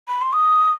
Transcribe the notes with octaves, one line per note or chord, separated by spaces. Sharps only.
B5
C6
D#6